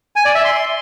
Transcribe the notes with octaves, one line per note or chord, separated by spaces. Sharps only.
G#5
D5
E5
C6